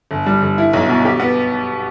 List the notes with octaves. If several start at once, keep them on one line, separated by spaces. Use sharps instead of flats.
G1
G3
G1
E4
B1
B2
G4
B3